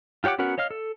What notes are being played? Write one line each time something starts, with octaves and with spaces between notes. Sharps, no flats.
F4 G4 C#5 F#5 D6
B3 C#4 F#4 A#4 F#5
C#5 D#5 F5 F6
A4